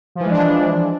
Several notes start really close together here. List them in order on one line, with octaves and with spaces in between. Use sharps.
F3 E3 G#3 D4